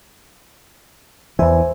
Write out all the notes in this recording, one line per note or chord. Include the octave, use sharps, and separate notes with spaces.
E2 E3 C5 E5 G#5